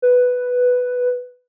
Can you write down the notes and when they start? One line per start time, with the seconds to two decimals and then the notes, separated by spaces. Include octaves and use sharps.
0.02 B4